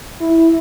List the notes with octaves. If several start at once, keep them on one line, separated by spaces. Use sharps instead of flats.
E4